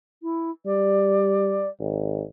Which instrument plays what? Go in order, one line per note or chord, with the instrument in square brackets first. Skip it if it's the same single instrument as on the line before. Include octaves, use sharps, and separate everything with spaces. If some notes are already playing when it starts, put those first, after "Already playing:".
[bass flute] E4
[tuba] G3 [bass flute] D5
[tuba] G#1